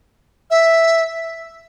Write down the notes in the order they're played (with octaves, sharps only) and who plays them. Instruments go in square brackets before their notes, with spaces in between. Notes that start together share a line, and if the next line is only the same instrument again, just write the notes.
[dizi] E5